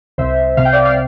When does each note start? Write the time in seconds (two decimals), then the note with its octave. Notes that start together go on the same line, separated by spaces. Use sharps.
0.18 C2 C5 E5
0.57 C3 F5
0.65 G5
0.73 D5 F5
0.85 F5